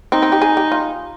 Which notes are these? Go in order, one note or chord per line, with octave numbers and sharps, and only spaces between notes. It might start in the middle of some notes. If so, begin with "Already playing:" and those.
C4 D#4
C4
G4
G#4
G4
F4